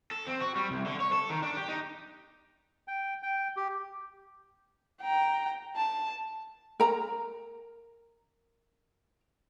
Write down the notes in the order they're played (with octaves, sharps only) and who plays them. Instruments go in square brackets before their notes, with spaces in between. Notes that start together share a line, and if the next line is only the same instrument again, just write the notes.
[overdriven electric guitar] A4
C4
F#4
G3
C2
D3
C#5
A4
D#3
D4
G4
D#4
[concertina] G5
G5
G4
[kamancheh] G5 A#5
A5
[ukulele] A#4 A#5